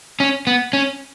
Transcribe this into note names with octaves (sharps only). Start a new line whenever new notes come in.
C#4
B3
C#4